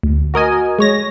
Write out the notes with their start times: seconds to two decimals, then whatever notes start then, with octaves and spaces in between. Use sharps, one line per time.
0.03 D2
0.34 F#4 A#4 D#5 G#5
0.79 G#3 C#5 A#6